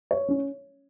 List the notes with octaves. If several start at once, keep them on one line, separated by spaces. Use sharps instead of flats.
C#5
C#4